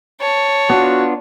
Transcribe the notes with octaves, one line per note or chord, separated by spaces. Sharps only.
C#5 A5
B3 D4 F4 F#4